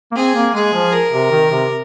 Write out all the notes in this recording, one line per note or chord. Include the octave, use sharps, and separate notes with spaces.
A#3
C4 G#4
A#3
G#3 G#4
F3
A#4
C3
D#3
C3